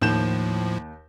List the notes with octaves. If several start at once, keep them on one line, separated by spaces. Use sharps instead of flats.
D#2 A2 F3 G6 E7